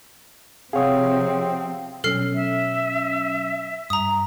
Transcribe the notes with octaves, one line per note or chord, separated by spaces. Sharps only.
C3 F3 C4 G#4 C#5 F5 F#5 D#6
B2 F#3 C#4 A4 F6 C7
E5
G2 A#5 D#6